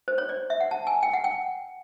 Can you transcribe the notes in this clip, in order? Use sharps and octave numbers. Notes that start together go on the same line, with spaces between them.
C5
C#5
D5
E5
F#5
A5
G#5
G5
F#5
G5